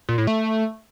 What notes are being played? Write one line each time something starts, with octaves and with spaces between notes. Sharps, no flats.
A#2
A2
A3